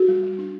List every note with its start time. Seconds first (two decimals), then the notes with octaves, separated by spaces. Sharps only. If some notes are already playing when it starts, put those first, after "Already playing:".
Already playing: F#4
0.08 G3
0.23 G3
0.39 D4